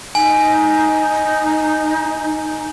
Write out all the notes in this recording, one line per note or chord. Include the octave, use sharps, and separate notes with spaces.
D#4 G#5